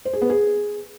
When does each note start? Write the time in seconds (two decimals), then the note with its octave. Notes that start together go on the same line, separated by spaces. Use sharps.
0.05 C5
0.13 G#4
0.22 B3
0.30 G#4